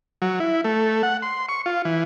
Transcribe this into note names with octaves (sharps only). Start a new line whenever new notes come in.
F#3
E4
A3
F#5
C6
C#6
F4
E3